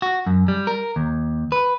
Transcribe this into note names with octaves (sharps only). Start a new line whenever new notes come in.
F#4
F#2
G3
A#4
D#2
B4